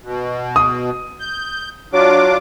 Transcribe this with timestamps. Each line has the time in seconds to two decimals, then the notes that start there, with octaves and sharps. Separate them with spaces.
0.04 B2
0.56 D#6
1.20 G6
1.93 F#3 D4 F4 D6